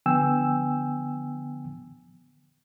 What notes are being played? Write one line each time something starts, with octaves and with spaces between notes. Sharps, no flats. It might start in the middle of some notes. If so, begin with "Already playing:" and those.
D3 F3 B3 G5 G#5 E6